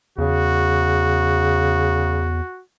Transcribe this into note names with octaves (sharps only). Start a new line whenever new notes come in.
E2 C#3 F#4